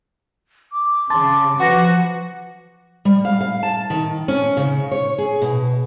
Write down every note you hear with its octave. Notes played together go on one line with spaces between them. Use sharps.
D6
C#3 A5 C6 A6
F3 F#4 B4 F#5 D6 A#6
G3
F5
F5
A5
D#3
C#4
C#3
C#5
G#4
B2